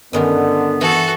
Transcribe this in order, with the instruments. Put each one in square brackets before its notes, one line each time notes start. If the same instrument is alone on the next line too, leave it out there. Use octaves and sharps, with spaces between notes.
[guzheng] G2 D#3 C#4 [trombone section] D3 [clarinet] B3
[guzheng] E3 [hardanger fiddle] F#4 A4